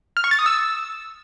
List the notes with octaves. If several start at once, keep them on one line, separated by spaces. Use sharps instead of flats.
F6
C#6
A6
D#6
E6